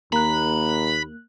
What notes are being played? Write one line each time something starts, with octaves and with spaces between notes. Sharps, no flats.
D#2 A#3 A#5 B5 F#6